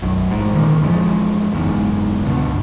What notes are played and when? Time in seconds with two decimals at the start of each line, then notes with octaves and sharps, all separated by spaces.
0.02 B1 F#2
0.31 A1 G#2
0.54 A#2 D3 D#3 A#3
0.81 F2 E3 F3 G#3
1.52 F#1 E2 G#2
2.25 C#2 G2 B2 D3